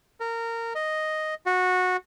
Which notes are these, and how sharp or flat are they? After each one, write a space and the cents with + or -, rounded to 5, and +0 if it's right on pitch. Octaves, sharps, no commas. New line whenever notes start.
A#4 -20
D#5 +0
F#4 -15